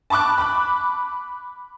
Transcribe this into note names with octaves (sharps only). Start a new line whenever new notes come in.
A5 B5 C#6 D6 F#6
B5 F#6